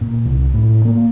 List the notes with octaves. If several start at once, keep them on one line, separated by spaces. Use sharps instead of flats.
A#2
C2
A2
A#3